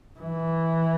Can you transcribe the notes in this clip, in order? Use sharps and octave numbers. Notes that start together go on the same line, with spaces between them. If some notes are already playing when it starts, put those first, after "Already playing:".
E3